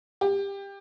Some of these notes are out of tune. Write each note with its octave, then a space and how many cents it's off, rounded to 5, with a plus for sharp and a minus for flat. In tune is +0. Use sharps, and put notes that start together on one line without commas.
G4 +20